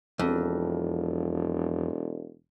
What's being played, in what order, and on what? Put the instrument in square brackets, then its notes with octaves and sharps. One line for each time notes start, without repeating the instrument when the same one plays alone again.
[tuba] E1 [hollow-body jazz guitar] F2